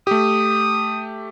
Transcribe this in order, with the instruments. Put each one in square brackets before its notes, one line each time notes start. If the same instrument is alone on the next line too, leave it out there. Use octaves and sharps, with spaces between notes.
[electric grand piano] A3 G4 [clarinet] D#6